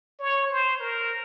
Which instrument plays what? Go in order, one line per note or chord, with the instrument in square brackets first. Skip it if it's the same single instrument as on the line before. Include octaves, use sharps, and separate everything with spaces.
[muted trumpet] C#5
C5
A#4